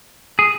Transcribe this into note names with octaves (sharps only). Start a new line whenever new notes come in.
G#4